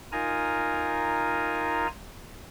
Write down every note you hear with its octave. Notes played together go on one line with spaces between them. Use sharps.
D#4 F4 A#4 G#5 A#5